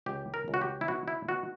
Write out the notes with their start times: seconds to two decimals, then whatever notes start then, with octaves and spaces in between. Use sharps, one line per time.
0.06 C#2 G4
0.34 A#4
0.48 C#2
0.54 F#4
0.62 G4
0.81 E4
0.88 B2 F#4
1.08 E4
1.29 B2 F#4